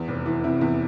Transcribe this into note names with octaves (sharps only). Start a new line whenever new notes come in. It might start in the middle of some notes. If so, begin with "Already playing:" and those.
Already playing: E2
F1
E3
C3 E4
E2